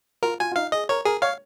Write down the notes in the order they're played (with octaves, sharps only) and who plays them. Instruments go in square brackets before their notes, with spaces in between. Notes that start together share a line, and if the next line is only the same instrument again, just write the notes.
[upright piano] F4 [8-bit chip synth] A#4
[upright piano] F4 [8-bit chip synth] G#5
[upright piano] F4
[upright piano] D#4 [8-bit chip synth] F5
[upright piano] G#4 [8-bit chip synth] D#5
[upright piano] A#4 [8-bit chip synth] C#5
[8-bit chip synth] G#4 [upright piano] A#4
[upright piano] C#5 [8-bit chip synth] F5